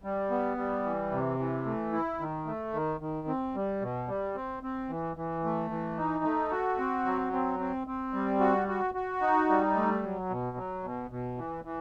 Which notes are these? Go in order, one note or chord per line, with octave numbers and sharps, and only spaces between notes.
G3
B3
G3
E3
C3
E3
A3
E4
D#3
A3
D#3
D#3
C4
G3
B2
G3
C4
C4
E3
E3
A3
E3
D#4
A3
F#4
C4
F#3
C4
C4
C4
G3
F#4
F#4
F#4
D#4
G3
A3
F#3
B2
F#3
B2
B2
E3
E3